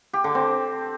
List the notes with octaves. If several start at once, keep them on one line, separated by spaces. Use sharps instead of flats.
G4
D3
C4